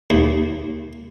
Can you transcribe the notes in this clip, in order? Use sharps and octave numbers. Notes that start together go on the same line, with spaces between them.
D#2